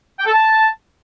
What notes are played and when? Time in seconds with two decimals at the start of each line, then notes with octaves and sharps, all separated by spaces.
0.19 G5
0.26 A4
0.32 A5